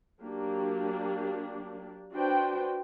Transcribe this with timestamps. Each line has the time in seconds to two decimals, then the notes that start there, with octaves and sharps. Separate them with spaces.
0.21 F#3 A#3 D4 G4
2.12 D4 F#4 B4 C5 G5